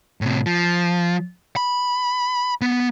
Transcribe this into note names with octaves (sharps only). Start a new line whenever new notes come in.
A2 C3
F3
B5
B3